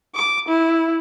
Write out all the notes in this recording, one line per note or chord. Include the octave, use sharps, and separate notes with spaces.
D6
E4